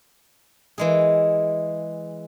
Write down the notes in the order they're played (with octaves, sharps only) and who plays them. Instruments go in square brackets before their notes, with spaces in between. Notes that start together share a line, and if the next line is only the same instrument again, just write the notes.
[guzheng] E3 G#3 G#4